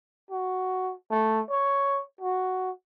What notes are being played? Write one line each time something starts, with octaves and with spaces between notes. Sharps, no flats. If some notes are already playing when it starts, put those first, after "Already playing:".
F#4
A3
C#5
F#4